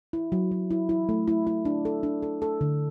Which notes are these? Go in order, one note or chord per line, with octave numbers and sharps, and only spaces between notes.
E4
F#3
F#3
E4
E4
A3
E4
E4
D4
A4
D4
A4
A4
D3